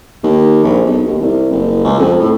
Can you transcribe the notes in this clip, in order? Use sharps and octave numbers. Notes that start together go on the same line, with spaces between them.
D#2
A#1
B1
D#2
C2
F#1
C#2
F2
A2